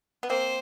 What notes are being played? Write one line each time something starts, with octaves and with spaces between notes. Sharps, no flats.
B3
A#3 C4 C5